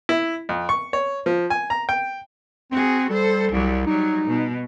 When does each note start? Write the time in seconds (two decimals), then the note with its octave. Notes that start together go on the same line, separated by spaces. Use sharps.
0.09 E4
0.49 F2
0.69 C#6
0.93 C#5
1.26 F3
1.50 G#5
1.70 A#5
1.89 G5
2.72 C4 F#4 G#4
3.10 G3 A4 C5
3.51 C2 F#3 G3
3.86 F#3 G3 D#4
4.27 B2